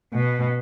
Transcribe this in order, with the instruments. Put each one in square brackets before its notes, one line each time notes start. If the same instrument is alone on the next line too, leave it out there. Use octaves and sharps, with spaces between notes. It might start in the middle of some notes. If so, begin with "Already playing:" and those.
[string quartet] B2